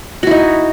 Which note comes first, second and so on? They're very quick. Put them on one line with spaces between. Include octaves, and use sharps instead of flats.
F#4 E4 D#4